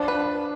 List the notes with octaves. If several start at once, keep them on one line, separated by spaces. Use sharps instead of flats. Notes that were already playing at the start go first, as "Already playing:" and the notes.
Already playing: F3 D4
B4